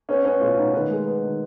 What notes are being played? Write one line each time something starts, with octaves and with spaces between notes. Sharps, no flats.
B3 C#4
B3 C#4
B2 F4
B2 D#4
D#3 B4
G#3
B3
D#3